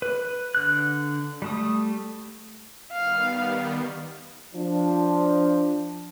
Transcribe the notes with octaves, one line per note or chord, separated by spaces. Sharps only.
B4
D3 F#6
G3 A3 D#6
D#3 G3 B3 F5
F3 D4